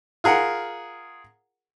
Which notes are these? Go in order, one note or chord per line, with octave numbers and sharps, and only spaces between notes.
F4 G#4 A#4 F#5